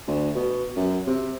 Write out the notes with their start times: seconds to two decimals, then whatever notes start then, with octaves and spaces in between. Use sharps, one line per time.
0.07 D2
0.35 B2
0.76 F#2
1.07 C3